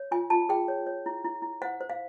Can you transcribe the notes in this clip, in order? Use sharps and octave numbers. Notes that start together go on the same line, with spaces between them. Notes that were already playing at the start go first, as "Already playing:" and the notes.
Already playing: C#5
F4 G#5
F4 A5
G#4 G5
C#5
C#5
E4
E4
E4
C5 F#5
C5
F5